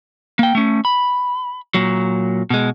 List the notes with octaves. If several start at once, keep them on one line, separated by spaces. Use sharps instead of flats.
A#3 G5
A3 C#4
B5
A#2 F#3
B2 G#3